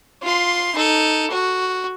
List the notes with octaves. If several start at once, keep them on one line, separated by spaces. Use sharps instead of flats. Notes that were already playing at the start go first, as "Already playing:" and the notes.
F4 C6
D#4 A4
F#4